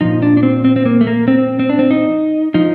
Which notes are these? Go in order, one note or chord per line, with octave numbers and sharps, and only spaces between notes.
A#2 F3 D#4
D4
D4
C4
C4
C4
A#3
A3
A#3
C4
C4
D4
C4
D#4
F3 D#4